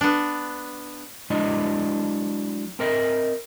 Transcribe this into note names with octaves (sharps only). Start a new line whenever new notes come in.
B3 D4
F#3 G#3 D4 E4 D#5
C4 A#4 D#5 E5